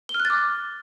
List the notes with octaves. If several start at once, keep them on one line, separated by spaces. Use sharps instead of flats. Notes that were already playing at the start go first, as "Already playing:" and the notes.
G7
F6
F#6
A6
D6